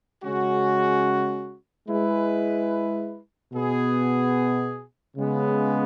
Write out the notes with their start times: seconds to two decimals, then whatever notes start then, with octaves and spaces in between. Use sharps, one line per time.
0.24 C#3 G#3 C#4 F#4
1.88 G#3 E4 B4
3.52 B2 B3 G#4
5.16 C#3 G#3 B3